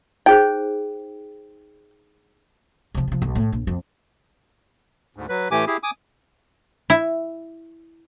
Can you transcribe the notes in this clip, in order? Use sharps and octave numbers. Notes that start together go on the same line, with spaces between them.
D#4 G#4 C5 G5
C3 F3
C3 F3
B1
A2
A#1
F2 C4
D2 G#2
F#3 B4
A2 E3 A3 G4 G#5 D6
E4 G4 G#4
G#5 D6 D#6
E4